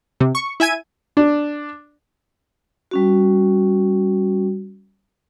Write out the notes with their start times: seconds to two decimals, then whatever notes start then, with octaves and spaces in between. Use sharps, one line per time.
0.20 C3
0.35 C#6
0.60 E4 E5 G#5 G#6 D#7
1.17 D4
2.91 G3 C#4 F#4